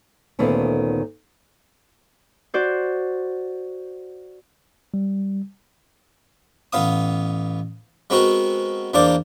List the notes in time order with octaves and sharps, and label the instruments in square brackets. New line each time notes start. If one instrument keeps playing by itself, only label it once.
[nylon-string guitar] D2 A#2 D#3 A3 B3 C#4
[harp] F#4 C5 D5
[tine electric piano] G3
[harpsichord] A1 B3 F5 D#6
G#3 B3 C4 F#4 A#4
E2 A#3 D4 A#4 C5 D5